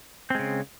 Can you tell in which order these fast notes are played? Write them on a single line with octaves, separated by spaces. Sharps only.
C4 G#3 C#3